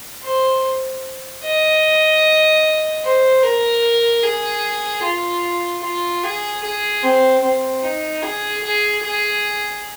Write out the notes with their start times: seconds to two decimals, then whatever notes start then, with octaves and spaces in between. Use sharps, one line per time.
0.24 C5
1.44 D#5
3.04 C5
3.43 A#4
4.23 G#4
5.03 F4
5.84 F4
6.23 G#4
6.63 G#4
7.03 C4
7.43 C4
7.83 D#4
8.23 G#4
8.63 G#4
9.03 G#4